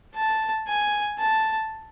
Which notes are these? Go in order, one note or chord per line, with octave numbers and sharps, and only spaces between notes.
A5
G#5
A5